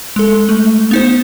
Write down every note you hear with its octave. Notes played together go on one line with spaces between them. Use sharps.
G#3 A4
A3
B3 D#4 C5